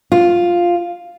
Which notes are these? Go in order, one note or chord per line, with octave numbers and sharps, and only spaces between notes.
F4